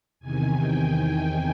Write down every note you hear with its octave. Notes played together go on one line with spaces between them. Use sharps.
E2 C3 D#3 G#5
G5